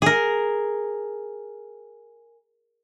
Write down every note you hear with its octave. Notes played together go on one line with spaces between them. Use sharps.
G#4 A#4